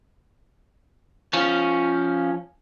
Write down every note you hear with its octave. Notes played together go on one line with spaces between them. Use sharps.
F3 C#4